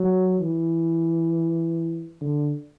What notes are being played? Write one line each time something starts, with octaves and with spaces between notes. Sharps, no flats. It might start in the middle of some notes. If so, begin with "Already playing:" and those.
Already playing: F#3
E3
D3